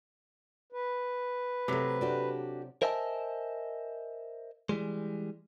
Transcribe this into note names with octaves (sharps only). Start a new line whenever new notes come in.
B4
C3 F#3 A3 C4
D4 F#4 G4
A#4 C5 D#5 E5 G#5 A5
E3 G3 G#3